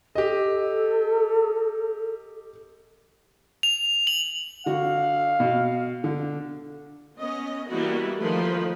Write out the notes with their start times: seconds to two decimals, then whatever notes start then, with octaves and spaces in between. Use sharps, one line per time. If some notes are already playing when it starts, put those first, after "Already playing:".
0.15 G4 A4 D#5
3.63 F7
4.07 F#7
4.66 D3 F#4 F5
5.40 B2
6.04 D3
7.19 B3 C#4 D#5
7.70 E3 G3 A#3 B3 E4 F#4
8.18 D#3 F3 A3 B4